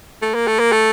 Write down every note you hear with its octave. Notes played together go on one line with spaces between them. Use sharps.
A3
A#3
A3
A#3
A3